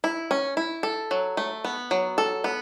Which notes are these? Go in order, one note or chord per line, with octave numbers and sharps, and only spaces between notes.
E4
C#4
E4
A4
F#3
A3
B3
F#3
A4
B3